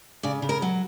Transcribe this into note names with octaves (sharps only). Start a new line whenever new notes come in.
C#3 D5
C#3
A#4
F#3